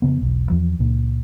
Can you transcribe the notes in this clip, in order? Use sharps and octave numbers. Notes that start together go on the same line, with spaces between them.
F2 C#3 B3
E1 B1
E2 F3
C#2 A#2